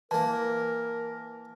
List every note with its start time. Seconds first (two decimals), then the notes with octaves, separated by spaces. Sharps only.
0.11 E3 A#3 A#4 A5